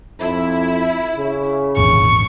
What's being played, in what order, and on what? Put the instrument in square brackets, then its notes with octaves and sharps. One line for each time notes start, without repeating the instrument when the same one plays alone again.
[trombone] F2 [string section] E4
[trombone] C#3
[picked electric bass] G#1 E2 A#2 [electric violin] C#6